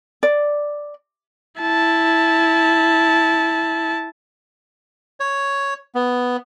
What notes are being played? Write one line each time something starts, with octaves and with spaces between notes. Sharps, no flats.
D5
E4 A5
C#5
B3